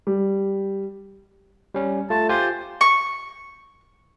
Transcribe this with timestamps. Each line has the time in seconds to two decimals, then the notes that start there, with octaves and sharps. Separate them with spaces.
0.07 G3
1.74 G3 C#4
2.10 A3 F4 A5
2.29 F4 G4 C5 G#5
2.81 C#6